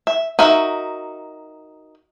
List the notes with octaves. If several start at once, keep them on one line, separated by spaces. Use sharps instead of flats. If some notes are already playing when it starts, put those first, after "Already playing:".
E5
D#4 F#4 A#4 E5